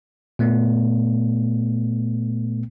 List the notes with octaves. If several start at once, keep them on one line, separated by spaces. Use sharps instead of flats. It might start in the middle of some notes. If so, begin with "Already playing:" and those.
A#2 A3 B3